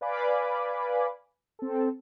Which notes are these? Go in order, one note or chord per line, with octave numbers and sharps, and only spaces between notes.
B4 D5 F5 G#5 B5 D6
C4 A4